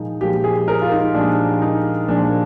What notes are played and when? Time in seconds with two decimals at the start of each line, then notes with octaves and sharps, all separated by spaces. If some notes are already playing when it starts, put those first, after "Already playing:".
Already playing: A#2 F3 G#3 D#4
0.21 A#2 F3 G#3 G4
0.44 G#4
0.68 A#4
0.82 F4
0.92 D#4
1.14 A#2 F3 G#3 D4
1.62 D#4
2.08 A#2 F3 G#3 D4